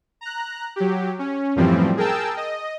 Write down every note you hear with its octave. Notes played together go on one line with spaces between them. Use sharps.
A#5 F#6
F#3 G4
C#4
F#2 A2 E3 F3 G3 C4
G#4 A#4 G5 A5 E6
D#5